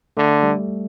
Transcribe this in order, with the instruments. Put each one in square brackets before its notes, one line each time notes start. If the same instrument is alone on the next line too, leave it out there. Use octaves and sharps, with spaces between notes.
[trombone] D3 [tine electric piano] A3
[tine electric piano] G3